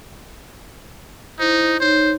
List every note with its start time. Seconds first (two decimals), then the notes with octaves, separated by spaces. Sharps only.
1.39 D#4 E4 C5
1.80 D#4 C5 C#5